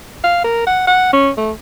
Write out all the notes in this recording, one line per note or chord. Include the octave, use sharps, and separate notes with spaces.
F5
A#4
F#5
F#5
C#4
A3